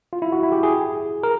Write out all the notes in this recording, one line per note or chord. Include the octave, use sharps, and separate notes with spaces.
F4
E4
F#4
E4
G4
G#4
A#4